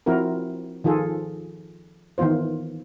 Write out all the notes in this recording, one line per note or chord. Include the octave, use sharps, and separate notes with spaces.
F3 C4 E4 F#4 A#4
D#3 F3 F4 G#4 A4
D#3 E3 B3 F4 C5